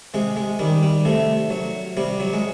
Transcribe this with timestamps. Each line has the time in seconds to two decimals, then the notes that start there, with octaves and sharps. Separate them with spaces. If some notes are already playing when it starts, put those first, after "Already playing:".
0.14 C3 G#3
0.37 G#3
0.59 D#3 G3
0.83 G3
1.05 C3 A3
1.50 F#3
1.97 C3 G3
2.20 F#3
2.33 G#3